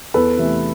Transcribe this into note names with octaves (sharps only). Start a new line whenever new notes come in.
E2 A4 B4
C3 E3 A3